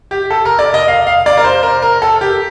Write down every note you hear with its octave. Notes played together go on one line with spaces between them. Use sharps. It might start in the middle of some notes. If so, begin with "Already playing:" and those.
G4
A4
A#4
D5
D#5
F5
F5
D5
A#4
C5
A#4
A#4
A4
G4